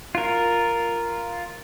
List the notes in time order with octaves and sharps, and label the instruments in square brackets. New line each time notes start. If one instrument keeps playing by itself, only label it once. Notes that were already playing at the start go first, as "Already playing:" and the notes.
[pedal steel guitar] F4 A#4